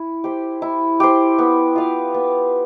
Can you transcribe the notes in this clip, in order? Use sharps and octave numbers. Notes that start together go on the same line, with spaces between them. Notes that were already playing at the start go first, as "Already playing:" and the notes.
Already playing: E4
G4 C5
E4
G4 C5
B3
F4 B4 F5
B3